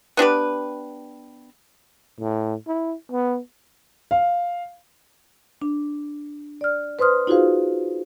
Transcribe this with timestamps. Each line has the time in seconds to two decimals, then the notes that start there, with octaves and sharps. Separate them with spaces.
0.17 B3 D4 G4 B4
2.20 A2
2.67 E4
3.12 B3
4.11 F5
5.62 D4
6.61 D5 F6
6.99 B4 C5 C6 D#6 F6
7.27 D#4 F4 F#4 G#4 C5 F5